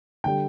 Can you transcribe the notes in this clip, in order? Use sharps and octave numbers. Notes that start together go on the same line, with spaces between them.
D3 G3 G5